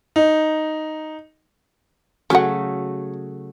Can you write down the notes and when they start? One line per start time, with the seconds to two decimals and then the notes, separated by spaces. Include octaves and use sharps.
0.16 D#4
2.30 C#3 F#3 A3 C#4 F#5